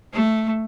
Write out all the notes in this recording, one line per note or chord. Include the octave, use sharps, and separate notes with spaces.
A3